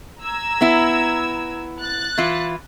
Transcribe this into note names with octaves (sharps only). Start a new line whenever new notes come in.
A#5 E6 G#6
B3 E4
F#6 A6
E3 E4 F4